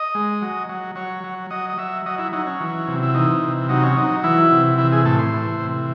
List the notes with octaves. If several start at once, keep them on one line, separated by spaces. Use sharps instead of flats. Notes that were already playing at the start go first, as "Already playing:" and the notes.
Already playing: D#5
G#3
F#3
F#3
F#3 C#5
F#3
F#3 D#5
D#5
F#3 E5
F#3 D#5
E4
F#3 D#4
C#4
E3
C3
E4
E3 D#4
C3
F#3 D#4
C#4
F#3 D#4
E3 E4
C3
E3 E4
G#4
A2 A4
C5
E3
C3